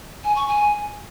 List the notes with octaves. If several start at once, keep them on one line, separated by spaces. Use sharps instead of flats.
G#5
C#6
G#5